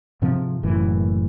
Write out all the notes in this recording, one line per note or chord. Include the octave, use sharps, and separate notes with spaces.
G#2 C3 F3 C4
F#1 F#2 A2 E3